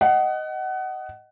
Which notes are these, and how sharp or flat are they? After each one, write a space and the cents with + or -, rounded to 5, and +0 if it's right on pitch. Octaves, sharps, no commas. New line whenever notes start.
D#5 +0 F#5 +25